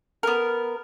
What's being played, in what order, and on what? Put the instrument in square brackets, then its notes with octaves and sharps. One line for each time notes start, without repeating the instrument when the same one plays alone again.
[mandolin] B3 A#4